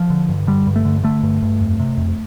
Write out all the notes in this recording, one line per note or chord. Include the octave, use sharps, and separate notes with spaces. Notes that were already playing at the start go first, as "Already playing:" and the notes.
Already playing: F3
D3
G2
D3 G3
G2
A3
D3
D3 A3
G2
G2
F2
C3
F2